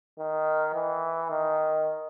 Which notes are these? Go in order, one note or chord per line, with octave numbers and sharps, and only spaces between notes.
D#3
E3
D#3